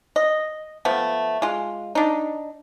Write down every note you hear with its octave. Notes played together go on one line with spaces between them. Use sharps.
D#5
F3 A3 B3
G#3 F4
D4 D#4